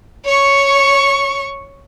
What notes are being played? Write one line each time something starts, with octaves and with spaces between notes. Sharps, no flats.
C#5 C#6